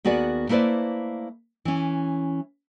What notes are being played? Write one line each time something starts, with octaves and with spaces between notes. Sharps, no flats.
D#2 B3 F#4 G#4 A#4 D5
A3 A#3 E4 B4 C5 D5
E3 C#4